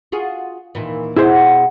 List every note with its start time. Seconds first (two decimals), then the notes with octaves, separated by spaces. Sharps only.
0.12 F4 F#4 G#4
0.75 D#2 A#2 E3
1.17 B2 B3 E4 G#4 C5